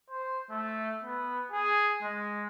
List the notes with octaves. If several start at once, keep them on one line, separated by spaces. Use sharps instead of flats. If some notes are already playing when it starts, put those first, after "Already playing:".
C5
A3
B3
G#4
G#3